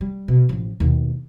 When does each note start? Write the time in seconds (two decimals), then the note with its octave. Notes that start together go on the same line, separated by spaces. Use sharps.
0.01 G3
0.28 B2
0.49 A1 F3
0.80 D#2 B2